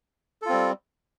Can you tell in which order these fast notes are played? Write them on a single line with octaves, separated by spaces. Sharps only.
A4 F4 C4 G3